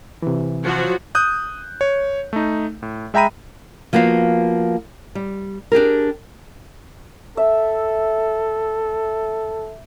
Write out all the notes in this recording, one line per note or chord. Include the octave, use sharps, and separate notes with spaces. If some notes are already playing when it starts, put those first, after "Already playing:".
C3 E3
F3 F#3 F#4
D#6 F#6 G6
C#5
A3 D#4
A2
G#3 E5 G5 A#5 B5 D#7
F3 A#3 B3 F#4 F5
G3
D4 G4 G#4 A#4
A4 E5